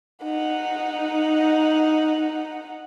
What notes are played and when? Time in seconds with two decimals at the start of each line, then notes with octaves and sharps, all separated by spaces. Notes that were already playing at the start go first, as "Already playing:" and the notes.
0.23 D#4 F#5